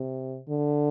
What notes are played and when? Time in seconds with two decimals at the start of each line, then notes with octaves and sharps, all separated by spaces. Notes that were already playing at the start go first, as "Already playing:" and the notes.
Already playing: C3
0.48 D3